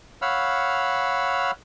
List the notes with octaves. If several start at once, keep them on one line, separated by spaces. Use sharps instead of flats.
C#5 F5 F#5 B5 E6 F6